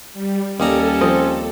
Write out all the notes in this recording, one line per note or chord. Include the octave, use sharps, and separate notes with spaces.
G3
D#2 G3 C#4 A4 A#5
F3 C4 D#5